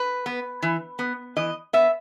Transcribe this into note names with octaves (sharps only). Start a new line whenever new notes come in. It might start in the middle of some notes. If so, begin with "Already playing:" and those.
Already playing: B4
B3
E3
B3
E3 D#5
B3 E5